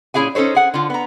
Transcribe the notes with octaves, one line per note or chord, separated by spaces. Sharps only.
A#2 C#4 E4 G#4 F5 G#5
C#4 D#4 A4 C5 C#5
G#4 F#5
D3 F4
B3 A#5